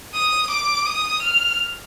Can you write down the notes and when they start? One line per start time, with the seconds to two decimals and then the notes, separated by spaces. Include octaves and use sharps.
0.14 D#6
0.50 D6
0.86 D#6
1.22 F6